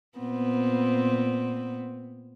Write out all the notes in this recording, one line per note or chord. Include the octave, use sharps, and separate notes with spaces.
A#2 B3 C4